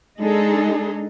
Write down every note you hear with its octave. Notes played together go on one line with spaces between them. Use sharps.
G#3 D4 D#4 G#4 A4